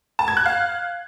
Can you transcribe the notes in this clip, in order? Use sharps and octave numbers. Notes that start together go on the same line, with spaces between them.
A5
G#6
F#6
F5